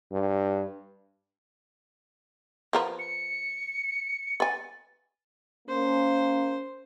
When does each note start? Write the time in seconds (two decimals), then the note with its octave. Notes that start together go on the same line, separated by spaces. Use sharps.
0.12 G2
2.73 F3 A#4 B4
2.99 C#7
4.40 B4 G#5 A6
5.69 A#3 C#4 C5